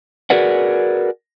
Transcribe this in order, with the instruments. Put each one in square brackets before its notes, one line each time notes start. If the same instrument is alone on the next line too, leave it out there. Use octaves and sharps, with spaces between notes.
[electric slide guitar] F#4 G#4 A#4 B4 D5 F#5